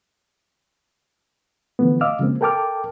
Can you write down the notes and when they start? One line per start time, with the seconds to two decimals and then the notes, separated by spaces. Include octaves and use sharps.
1.79 D3 E3 F3 A3 B3
2.01 D#5 F5 D6 E6 F6
2.19 C#3 F3 G#3 A#3 C4
2.41 A4 A#4 G5 A5 D6 F6